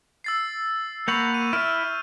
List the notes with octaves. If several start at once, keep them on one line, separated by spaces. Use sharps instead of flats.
E6 A6 C7
A#3 F#5 B5 C#6 G6 F7
D#7
E4 E5 F6